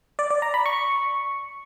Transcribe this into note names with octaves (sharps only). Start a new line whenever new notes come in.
D5
D5
A#5
B5
C#6